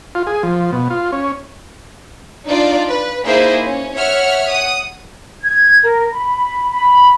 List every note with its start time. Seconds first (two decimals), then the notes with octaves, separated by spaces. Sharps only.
0.15 F4
0.27 G#4
0.43 F3
0.72 B2
0.90 F4
1.12 C#4
2.46 D4 D#4 F4 D5
2.89 B4
3.25 A#3 D#4 E4 G#4 A#4 C5
3.66 C#4
3.97 C#5 E5 F#5 F6
4.51 F#5 D#6
5.43 G#6
5.84 A#4
6.12 B5
6.70 B5